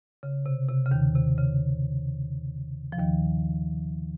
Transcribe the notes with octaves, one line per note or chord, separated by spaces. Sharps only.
C#3
C3
C3
C#3
D#2 D#3
C3
C#3
F3
D#2 D#3